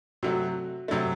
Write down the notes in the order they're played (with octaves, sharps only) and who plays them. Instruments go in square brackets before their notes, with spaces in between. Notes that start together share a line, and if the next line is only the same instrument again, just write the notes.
[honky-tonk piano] C3 F#3 A3 [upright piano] F#4
[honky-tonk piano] C3 F#3 A3